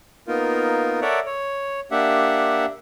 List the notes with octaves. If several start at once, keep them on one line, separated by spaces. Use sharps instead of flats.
A#3 B3 D#4 F4 A#4
A4 A#4 C#5 D5 E5 F#5
C#5
A#3 D4 G4 E5 F#5